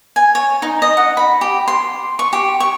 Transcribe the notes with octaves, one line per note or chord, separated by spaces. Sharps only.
G#5
C#5
D#4
D#5
F#5
B5
G4
C6
C#6
G4
C#6